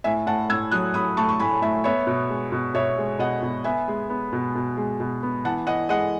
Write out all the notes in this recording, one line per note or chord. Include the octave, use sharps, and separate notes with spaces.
A2 E5 G#5
A2 F#5 A5
A2 E6 G#6
F#3 D#6 F#6
A2 B5 D#6
A3 A5 C#6
C#6
A2 G#5 B5
A2 E5 G#5
B3 C#5 E5
B2
G#3
B2
B2 C#5 E5
G#3
B2 D#5 F#5
B2
B3 E5 G#5
G#3
B3
B2
B2
G#3
B2
B3
E3 F#5 A5
E3 D#5 F#5
G#3 D#5 F#5